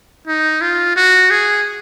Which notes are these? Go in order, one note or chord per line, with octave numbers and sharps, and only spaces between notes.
D#4
F4
F#4
G#4